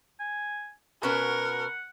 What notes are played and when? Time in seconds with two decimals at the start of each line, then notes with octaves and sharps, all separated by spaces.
0.20 G#5
1.03 B2 C#4 A#4 B4 F#5